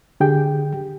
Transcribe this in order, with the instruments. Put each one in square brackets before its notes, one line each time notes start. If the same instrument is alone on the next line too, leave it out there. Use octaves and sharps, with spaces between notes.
[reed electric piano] D3 G4 G#4 G5